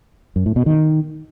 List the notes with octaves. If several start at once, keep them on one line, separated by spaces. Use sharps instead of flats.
F#2
A2
B2
D#3